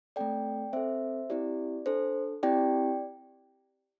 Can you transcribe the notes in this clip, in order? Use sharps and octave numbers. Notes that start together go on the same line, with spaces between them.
A3 C4 A4 D5 G5
C4 A4 C5 E5
C4 E4 G4 D5
D4 A4 C5
C4 E4 G4 D5 G5